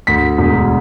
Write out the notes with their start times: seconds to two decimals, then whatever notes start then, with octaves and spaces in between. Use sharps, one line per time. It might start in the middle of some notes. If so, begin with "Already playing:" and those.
0.07 D2 B6
0.38 E1